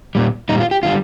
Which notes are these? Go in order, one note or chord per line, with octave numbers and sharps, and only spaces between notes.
A#2 G3
A#2 G3 D#4
F4
G4
D3 G3 F4